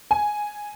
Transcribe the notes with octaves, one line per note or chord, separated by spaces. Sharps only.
G#5